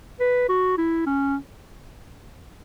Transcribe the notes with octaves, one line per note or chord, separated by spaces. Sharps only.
B4
F#4
E4
C#4